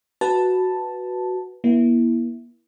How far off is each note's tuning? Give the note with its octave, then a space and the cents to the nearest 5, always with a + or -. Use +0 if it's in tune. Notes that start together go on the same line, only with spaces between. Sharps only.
F#4 +0 B4 -5 A5 +0
A#3 +45 E4 +0